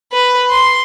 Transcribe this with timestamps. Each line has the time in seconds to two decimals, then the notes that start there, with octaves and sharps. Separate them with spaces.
0.12 B4
0.50 C6